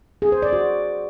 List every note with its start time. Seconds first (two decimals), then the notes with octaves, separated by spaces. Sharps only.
0.22 G#4
0.32 C5
0.42 D5
0.53 F#4